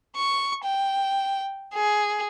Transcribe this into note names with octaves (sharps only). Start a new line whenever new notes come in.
C#6
G5
G#4